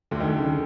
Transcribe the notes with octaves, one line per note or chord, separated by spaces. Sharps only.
D2 D3
D#3
D3
C#3
D3